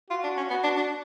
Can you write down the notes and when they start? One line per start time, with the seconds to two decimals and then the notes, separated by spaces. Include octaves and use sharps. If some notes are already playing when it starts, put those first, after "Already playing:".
0.10 F4 F#4
0.24 D4
0.37 C#4
0.50 B3 F#4
0.63 D4
0.77 D4